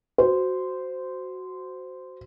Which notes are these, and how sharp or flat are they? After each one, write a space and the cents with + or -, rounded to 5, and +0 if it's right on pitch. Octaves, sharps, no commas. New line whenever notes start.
F#4 +5 C5 -15